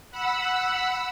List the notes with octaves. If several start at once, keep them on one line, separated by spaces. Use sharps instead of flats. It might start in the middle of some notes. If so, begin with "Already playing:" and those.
F#5 B5 E6